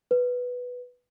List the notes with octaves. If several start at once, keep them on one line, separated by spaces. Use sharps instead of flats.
B4